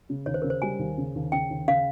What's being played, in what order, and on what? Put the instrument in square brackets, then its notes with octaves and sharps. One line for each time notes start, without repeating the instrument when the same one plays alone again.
[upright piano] C#3
[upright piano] D#2 [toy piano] C#5
[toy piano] C5
[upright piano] C#3 [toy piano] A#4
[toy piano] C5
[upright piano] G3 [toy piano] G#5
[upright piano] D#2
C#3
D#2
[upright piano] C#3 [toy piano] G5
[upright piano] D#2
[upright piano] C#3 [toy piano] F5